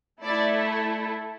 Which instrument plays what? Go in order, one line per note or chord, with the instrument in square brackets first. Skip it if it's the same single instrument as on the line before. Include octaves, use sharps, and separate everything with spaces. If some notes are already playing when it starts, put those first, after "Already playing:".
[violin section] A3 E4 A4 D5